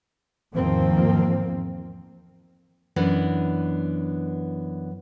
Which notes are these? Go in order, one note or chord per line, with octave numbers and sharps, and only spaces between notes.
E2 G#2 D#3 F3 A#3 C4
F#2 E3 B3 D4